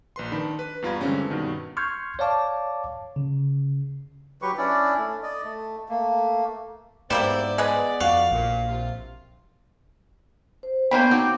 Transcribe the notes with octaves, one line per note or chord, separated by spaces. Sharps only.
A#1 B4 C6
D#3 D4 B5
B4
E2 G2 F4 A#5 B5 G#6
D3 E3 G3 G#3 C4 C#4
G2 B2 D#3
C6 C#6 F6 G6 G#6
C#5 D5 F5 A5 D6
C#3
F#3 G4 B4 C#6
C#4 D4 E4 D5
A3
D5 D#5
A3
A3 A#3
G#2 G3 A#3 B3 E4 C5 D5
G#3 G#4 B4
F2 F#4 F5
A#1 A#2
C3 F4
C5
A#3 B3 D4 C5 C#5 G5 B5
C4 D#4 F#4 D6